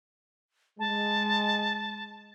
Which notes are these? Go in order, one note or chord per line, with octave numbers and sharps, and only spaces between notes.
G#3 A5